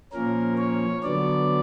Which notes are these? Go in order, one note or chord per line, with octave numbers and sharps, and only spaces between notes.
A#2 F3 A#3 C#4 A#4
C#5
D3 F#3 B3 D5